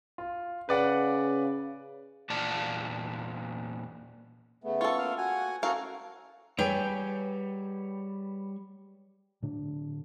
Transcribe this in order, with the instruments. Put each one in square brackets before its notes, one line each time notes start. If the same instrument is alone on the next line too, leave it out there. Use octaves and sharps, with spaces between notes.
[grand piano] F4
[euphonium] C#3 [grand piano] B4 D5 F#5
[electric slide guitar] E2 A#2 A#3 D5 F5 A5
[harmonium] C#3 A3 B3
[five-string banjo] F4 A4 [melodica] C#6
[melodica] A#3 F5
[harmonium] F#4 F#5 [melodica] G#5
[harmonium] C#4 F#5 [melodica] F#4 A4 [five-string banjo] A#4 F5
[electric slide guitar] G3 C#5 [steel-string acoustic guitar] G#4 B4 G5
[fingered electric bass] A2 D3 D4